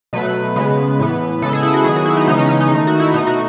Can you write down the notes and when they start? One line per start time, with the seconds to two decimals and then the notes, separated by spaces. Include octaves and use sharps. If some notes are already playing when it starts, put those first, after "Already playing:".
0.13 B2 F#3 A3 B4
0.56 C#3 G#3 B3
0.99 A2 E3 B3
1.42 C#3 G#3 B3 A4
1.53 G#4
1.63 E4
1.74 F#4
1.84 D#3 F#3 B3 G#4
1.96 F#4
2.06 E4
2.17 D#4
2.27 C#3 E3 G#3 B3 D#4
2.38 C#4
2.49 C#4
2.60 D#4
2.70 D#3 A3
2.87 F#4
3.00 E4
3.14 B2 A3 D#4
3.27 F#4